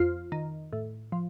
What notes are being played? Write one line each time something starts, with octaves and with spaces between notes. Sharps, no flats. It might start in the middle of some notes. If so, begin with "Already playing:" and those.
Already playing: F2 F4
D#3
A2
F3